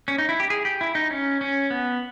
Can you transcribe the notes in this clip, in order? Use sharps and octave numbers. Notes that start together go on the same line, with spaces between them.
C#4
D#4
E4
G4
G#4
G4
E4
D#4
C#4
C#4
B3